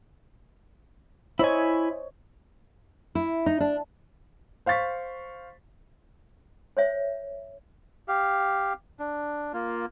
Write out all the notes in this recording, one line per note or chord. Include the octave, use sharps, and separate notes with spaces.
E4 C5 C#5 D#5 G#5
E4
D#4
D4
C5 F5 C#6 A6 B6
C5 C#5 E5
G4 F5
D4
A#3 F4